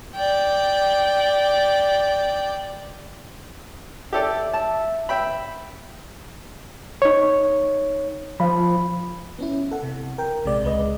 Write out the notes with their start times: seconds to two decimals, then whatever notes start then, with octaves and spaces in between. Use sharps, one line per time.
0.15 D5 G5
4.13 G4 A4 D5 E5
4.53 A5
5.09 E5 G5 B5
7.02 D#4 C#5
8.40 F3 B5
9.39 B3 C#4 E4
9.71 A4 F#5
9.83 C3
10.18 A#4 G5
10.45 A#1 C3 G#3 D5
10.63 C#2 G#3 B4 D#5